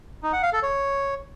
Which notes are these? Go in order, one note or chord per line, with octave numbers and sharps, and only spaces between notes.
D#4
F#5
F5
A4
C#5